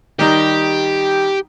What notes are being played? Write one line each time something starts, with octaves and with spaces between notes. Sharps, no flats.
D#3 G3 D#4 G4